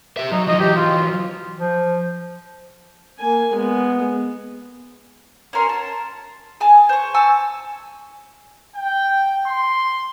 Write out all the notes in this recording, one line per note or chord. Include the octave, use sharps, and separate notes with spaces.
G4 E5
F#3 D#4
F3 F#3 D#5
E3 F#3 G4
F4
F3
A#3 G#5
G#3 B3
C#4 F#4 A#4 C6
A5
G#4 G#5 A5
C5 C#6
G#5 A5 C#6 E6
G5
C6